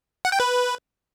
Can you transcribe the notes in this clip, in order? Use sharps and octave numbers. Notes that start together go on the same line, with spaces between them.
F#5
G5
B4